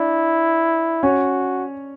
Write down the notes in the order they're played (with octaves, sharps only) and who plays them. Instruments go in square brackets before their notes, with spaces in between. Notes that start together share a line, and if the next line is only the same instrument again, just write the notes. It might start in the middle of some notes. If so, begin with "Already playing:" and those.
Already playing: [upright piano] D4 [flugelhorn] E4
[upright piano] C#4 C#5 [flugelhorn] F#4